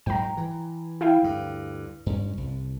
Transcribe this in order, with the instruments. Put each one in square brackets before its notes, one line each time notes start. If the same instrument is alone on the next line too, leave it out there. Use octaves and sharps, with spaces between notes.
[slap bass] G#2 F#3 G#3 [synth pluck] G5 A#5
[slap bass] E3
[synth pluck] E4 F5 G5
[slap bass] D2 G2
G2 C#4
C2